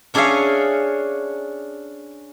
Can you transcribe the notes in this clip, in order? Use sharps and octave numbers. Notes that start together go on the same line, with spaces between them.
C#4 D4 G#4 C#5 E5 F5